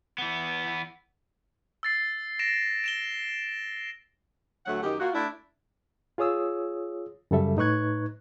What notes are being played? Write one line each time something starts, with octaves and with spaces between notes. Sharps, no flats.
E3 B3
E6 A6 C7
A#6 D7 E7
D7 E7 G7
D2 F#3 A3 F#5
F#2 D#3 D#4 G4
A#3 F4 F#4
A3 D4 E4
F4 G#4 C#5 D#6 E6
F#2 C#3 G3 A4 E5
A2 D#4 B4 C#6 F#6 G#6